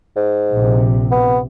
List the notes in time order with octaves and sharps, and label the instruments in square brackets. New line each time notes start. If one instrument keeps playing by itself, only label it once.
[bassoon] G#2
[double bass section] A#1 C3
[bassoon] B3